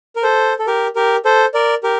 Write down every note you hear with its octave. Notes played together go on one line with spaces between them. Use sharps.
A#4
A4 C5
A4
G4 A#4
G4 A#4
A4 C5
A#4 D5
G4 A#4